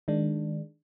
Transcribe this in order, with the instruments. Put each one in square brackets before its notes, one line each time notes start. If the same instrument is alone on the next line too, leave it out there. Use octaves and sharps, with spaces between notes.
[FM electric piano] D#3 G#3 D4